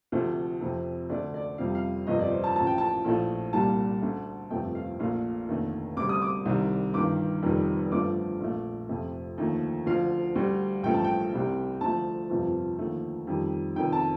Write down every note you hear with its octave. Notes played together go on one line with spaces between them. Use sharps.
D2 C3 F3 A3 C5
F2 C3 F3
D2 D3 A3 D5
D5
F2 C3 G3 F5
F5
G1 F2 C3 D#5
D5
C5
A5
A1 A2 F3 A5
G5
A5
A#1 A2 F3 A3
C2 A#2 G3 A5
D2 D3 A3
G1 F2 C3 F3 A3 G5
F5
A#1 A#2 A3 F5
F1 D#2 D3 A3
D2 C3 G3 D6
D#6
D6
C2 C3 D#3 G3
G1 G2 D#3 D6
F1 F2 D#3 G3
G1 G2 D3 F3 A3 D6
A#1 A#2 A3
F2 C3 F3 A3
D#2 D3 F3 A3
D2 D3 F3 F5
D2 D3 G3
A1 G2 F3 A3 G5
A5
G5
C2 C3 G3
D2 D3 F3 A3 A5
G1 F2 C3 F3
D#2 D3 F3 A3
F2 D#3 G3
F1 F2 D#3 G5
A5